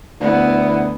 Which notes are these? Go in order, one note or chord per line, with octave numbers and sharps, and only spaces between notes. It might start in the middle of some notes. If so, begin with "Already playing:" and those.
D2 B3 E4